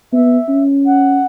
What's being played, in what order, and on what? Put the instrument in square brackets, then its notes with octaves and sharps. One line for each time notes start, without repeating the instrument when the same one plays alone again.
[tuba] B3 [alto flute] E5
[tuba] C#4
[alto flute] F#5